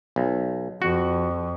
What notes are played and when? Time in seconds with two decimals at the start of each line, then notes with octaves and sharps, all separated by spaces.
0.16 B1
0.82 F2 F#4